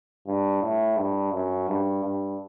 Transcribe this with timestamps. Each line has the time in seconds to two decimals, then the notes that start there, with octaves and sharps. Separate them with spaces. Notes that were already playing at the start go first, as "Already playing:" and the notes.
0.27 G2
0.62 A2
0.97 G2
1.32 F#2
1.68 G2
2.04 G2